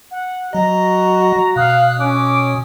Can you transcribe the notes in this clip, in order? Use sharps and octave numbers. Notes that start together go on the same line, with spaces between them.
F#5
F#3 F#4 D#5 A#5
B2 F5 D#6 F#6
C#4 D6